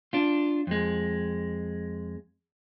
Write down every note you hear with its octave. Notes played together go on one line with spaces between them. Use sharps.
D4 F4
F2 G#3